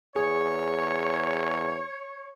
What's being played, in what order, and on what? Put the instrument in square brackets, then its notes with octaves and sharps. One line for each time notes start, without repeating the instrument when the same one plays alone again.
[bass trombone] E2 [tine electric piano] G#4 [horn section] C#5